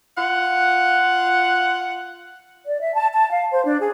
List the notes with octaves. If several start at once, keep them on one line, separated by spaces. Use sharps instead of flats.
F4 F#5
D5
E5
A5
A5
F5
C5
D4
G#4